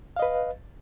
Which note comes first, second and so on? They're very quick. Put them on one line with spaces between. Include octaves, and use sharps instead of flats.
F5 D#5 B4